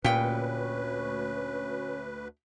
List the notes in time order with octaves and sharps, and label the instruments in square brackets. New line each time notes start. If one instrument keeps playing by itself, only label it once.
[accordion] D2 B4 [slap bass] A#2 [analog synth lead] C#4 [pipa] G4 G5